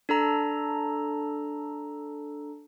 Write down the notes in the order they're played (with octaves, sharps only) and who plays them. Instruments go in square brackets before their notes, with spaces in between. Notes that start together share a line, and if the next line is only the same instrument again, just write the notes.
[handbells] D4 A4 A#5